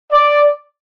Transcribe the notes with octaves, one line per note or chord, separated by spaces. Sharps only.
D5